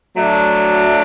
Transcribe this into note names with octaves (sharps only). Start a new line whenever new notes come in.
F#3 A3 D4